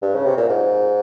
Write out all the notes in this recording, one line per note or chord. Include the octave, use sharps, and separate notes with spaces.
G2
C#3
C3
A#2
G#2